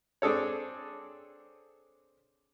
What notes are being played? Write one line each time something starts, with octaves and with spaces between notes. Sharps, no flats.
C4 D4 G#4 A4 C#5